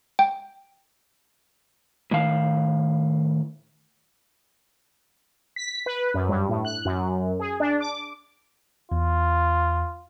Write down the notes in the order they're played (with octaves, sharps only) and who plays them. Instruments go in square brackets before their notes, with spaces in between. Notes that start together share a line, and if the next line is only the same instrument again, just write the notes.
[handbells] G5
[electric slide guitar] A2 D#3 F5
[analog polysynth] B6
B4
F#2
G2
A2
F#6
F#2
G#4
D4
D6
[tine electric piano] E2 [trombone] F4